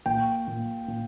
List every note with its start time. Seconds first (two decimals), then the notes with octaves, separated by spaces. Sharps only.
0.06 A#2 G5
0.47 A#2
0.88 A#2